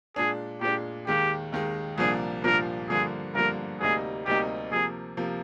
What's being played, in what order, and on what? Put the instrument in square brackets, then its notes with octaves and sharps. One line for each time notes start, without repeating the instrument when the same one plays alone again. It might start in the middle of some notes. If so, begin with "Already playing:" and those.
[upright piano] A#2 G#3 D4 [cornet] G#4
[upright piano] A#2 G#3 D4 [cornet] G4
[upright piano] D#2 D#3 G#3 [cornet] G4
[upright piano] D#2 D#3 G#3
[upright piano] C2 A#2 F3 A#3 D4 [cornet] G#4
[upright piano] C2 A#2 F3 A#3 D4 [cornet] A#4
[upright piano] G2 D3 F3 A#3 [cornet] G#4
[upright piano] G2 D3 F3 A#3 [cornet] A#4
[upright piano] D2 C3 G3 A#3 D#4 [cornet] G#4
[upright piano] D2 C3 G3 A#3 D#4 [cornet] G4
[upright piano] C3 F3 A#3 [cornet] G#4
[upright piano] C3 F3 A#3